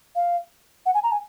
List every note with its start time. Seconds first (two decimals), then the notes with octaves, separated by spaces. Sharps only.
0.16 F5
0.86 F#5
0.94 G#5
1.03 A#5
1.12 G#5